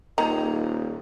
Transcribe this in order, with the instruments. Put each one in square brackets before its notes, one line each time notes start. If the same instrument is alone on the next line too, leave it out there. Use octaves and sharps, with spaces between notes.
[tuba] D#1 [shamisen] D#3 [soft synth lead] A#3 [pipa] G#4 A#5